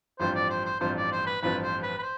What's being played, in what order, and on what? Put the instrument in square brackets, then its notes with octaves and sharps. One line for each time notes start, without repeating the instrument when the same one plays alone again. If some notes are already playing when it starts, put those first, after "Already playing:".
[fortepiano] A1 G2 F3 C4 F4 [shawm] C5
[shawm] D5
C5
C5
[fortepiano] A1 G2 F3 C4 F4 [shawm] C5
[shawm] D5
C5
B4
[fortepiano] A1 G2 F3 C4 F4 [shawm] B4
[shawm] C5
B4
B4
C5